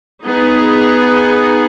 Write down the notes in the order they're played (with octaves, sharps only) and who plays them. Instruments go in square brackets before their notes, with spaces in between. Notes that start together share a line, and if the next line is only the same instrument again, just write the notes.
[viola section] B3 D#4 G#4